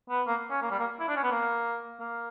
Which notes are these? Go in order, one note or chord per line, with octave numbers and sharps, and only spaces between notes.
B3
A#3
C#4
A#3
G3
A#3
E4
D4
C#4
B3
A#3
A#3